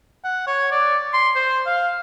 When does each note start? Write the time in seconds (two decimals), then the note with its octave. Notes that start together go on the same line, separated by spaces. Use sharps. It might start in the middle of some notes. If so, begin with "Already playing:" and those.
0.24 F#5
0.47 C#5
0.71 D5
1.13 C6
1.35 C5
1.66 F5